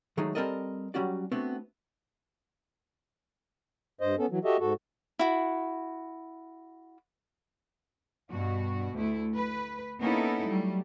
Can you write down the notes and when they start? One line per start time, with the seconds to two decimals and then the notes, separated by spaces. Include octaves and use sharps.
0.17 D#3 F#3 G#3 A3 D#4 G#4
0.35 G3 C4 A4 A#4 D5 D#5
0.94 F#3 G3 C#4 F#4 D5
1.32 A3 B3 C4 D4 F#4
4.01 G2 C5 D#5
4.19 B3 C#4 A4
4.30 E3 F#3
4.44 F#4 G4 A4 D#5 E5
4.60 G#2 F#4 A4
5.19 E4 F#4
8.31 G2 B2 F#4
8.94 D2 A3 E4
9.33 B4
10.00 A#3 B3 C#4 D#4 E4 A4
10.45 F#3 G3 A3